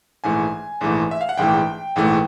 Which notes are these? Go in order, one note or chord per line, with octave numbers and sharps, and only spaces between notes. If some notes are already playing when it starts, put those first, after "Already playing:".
A#1 G#2 E3 A3 G#5
A#1 G#2 E3 A3
E5
F5
F#5
A#1 G#2 E3 A3 G5
A#1 G#2 E3 A3